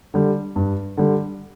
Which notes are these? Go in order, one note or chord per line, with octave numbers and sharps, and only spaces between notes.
D3 G3
G2
D3 G3